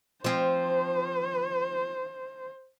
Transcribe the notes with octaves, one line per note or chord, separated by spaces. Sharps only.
F3 C4 C5